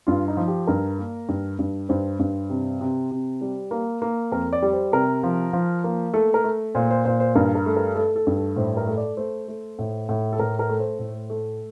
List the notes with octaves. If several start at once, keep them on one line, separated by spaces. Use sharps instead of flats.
G2 F4
D#4
F3
G4
G2 A#4
A#3
G2
G2
G2 C5
G2
C3
C3
C3
G3
A#3
A#3
F2 A#4
D5
G3
C5
C3 A#4
F3
F3
A#3
A3 A4
A#4
A3
A#2 C5
C5
A#2 C5
C5
G2 A#4
A#4
A3
A#4
A3 A4
A4
G2
A4
A2 C5
A#4
A3
D5
A3 C5
A3
A2
A2
A4
A2 A#4
A#4
A3
C5
A2
A3